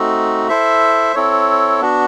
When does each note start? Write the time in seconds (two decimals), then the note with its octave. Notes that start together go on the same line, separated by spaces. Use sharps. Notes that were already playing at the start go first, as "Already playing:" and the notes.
Already playing: A3 C4 D#4 F#4
0.48 E4 A4 C5 E5
1.15 C4 E4 A4 C#5
1.81 B3 D4 F#4